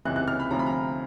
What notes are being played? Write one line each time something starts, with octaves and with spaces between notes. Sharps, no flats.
C#2 C3 E3 F#6
F#6
F6
B5
D2 C3 F3 A#5
B5
A#5